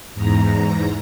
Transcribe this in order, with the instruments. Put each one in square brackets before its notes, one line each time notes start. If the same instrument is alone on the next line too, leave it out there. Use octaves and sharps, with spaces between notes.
[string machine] E2 G#2 A#5